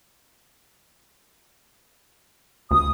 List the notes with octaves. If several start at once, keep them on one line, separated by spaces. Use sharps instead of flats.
D2 D#6